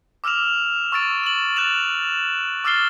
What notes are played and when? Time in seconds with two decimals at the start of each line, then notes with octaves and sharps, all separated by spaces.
0.24 D6 E6 F6 E7 F7
0.92 C#6 E6 A6 D7
1.24 E7 F#7
1.56 F#6 A6 E7 F7
2.64 D6 E6 F6 A6 C7 G7